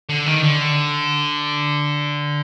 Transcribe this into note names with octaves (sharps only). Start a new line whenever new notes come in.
D3
D#3
D3